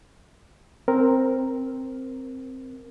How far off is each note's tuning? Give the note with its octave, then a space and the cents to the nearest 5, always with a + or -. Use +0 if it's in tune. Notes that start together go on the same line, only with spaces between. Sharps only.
C4 +0 A#4 +0